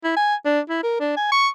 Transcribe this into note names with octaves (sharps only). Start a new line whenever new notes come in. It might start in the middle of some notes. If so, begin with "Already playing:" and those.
E4
G#5
D4
E4
A#4
D4
G#5
C#6